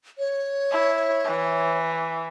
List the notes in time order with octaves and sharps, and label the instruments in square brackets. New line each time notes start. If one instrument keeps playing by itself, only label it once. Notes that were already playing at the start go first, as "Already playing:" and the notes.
[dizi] C#5
[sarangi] E4
E3